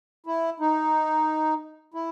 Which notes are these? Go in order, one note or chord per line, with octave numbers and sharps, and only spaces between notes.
E4
D#4
E4